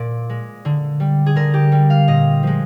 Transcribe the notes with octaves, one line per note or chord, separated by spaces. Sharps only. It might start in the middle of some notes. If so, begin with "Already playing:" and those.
Already playing: A#2 D5
G#3
D3
G3
G#4
D3 A#4
G4
G3
F5
A#2 D#5
F3 G#3